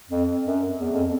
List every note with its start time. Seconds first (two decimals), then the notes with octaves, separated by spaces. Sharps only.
0.09 F2
0.45 F#2
0.80 E2
0.92 F2